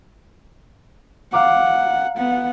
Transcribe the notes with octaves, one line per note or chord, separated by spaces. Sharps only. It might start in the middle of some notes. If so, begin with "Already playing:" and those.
F5 F#5 A#5 D6
B3 F#5